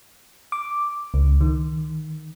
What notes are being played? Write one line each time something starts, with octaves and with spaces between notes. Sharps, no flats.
D6
C#2
D#3